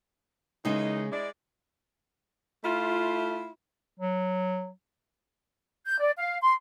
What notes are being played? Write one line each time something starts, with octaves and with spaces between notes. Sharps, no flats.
D#2 C#3 E3 G#3 D#4
G#3 E4 D5
A3 E4 F4
F#3
G6
D5
F5
C6